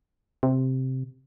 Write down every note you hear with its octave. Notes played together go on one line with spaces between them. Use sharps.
C3